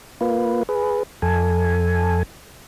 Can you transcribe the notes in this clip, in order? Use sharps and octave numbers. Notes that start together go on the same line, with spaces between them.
A#3 F4 B4
G#4 B4
F2 A4 G#5